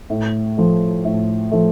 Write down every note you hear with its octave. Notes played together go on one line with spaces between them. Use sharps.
A2
F3 A3
A2
F3 A3